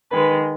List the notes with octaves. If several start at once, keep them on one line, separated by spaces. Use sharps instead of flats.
D#3 G#3 B4